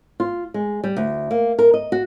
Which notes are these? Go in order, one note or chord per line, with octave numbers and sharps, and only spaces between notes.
F4
G#3
G3
D2
A#3
A#4
D#5
F#4